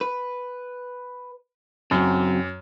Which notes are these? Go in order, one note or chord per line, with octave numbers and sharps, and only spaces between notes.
B4
F#2 C#3 F#3 C4